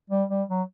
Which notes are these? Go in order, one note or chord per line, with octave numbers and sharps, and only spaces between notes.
G3
G3
F#3